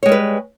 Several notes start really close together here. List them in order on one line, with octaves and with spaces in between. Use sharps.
C#5 G#3 G3 B4